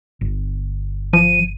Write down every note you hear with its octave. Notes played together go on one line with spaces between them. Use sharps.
G1
F3 D#7